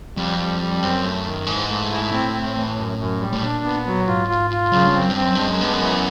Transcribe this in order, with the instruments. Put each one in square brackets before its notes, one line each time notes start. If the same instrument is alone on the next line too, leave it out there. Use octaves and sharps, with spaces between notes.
[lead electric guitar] F2 [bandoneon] G3
[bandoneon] G3
G3
[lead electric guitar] F#2 [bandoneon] C4
[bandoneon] A3
D#3
[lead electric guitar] G#2 [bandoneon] E3
[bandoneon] A3
E4
[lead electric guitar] A2 [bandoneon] C4
[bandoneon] C4
E3
F#2
F#2
G3
[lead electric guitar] A2
[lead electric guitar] A#2 [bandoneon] D4
[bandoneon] B3
F#3
[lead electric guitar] G#2 [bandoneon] F4
[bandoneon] F4
F4
[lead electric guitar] F#2 [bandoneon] C#3
[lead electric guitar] G2
[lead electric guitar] F#2 [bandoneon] C4
[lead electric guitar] G2
[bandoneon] C4
[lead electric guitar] F#2
[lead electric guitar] G2 [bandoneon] G#3
[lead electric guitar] F#2
[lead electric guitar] G2 [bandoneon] B3
[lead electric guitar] F#2
[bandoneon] E3